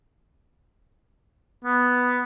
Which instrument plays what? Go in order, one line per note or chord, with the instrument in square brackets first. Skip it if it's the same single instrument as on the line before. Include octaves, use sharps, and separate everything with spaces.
[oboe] B3